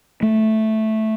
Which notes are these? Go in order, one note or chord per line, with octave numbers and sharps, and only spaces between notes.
A3